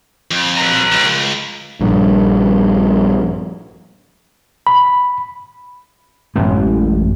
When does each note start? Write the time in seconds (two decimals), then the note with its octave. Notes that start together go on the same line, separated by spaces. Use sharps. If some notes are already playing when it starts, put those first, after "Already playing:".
0.31 F2
0.57 B4 A#5
0.92 C#2
1.81 A#1 G2
4.67 B5
6.36 A1 F#2 G#3 B3